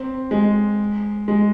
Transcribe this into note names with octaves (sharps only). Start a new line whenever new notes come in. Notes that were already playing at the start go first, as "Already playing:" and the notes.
Already playing: C4
G#3
G#3